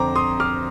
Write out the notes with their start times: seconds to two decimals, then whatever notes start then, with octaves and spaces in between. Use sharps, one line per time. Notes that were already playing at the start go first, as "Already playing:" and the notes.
Already playing: F2 D3 C5 A#5 D6
0.16 C6 D#6
0.40 D6 F6